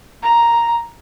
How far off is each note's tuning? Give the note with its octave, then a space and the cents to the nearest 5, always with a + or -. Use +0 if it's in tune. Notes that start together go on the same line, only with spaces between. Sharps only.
A#5 +5